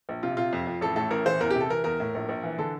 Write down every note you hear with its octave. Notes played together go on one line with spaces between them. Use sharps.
A#1
C3 F4
C3 F4
F2
F2
A1 A4
A2 A4
A1 A#4
E3 C5
E2 A#4
G4
C3
A4
E3 A#4
E2 A#4
A2
A#1
A#1
E3
D3 A4